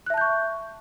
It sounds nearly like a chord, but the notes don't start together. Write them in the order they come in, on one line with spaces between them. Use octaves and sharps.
F#6 E5 A5 G6 C#6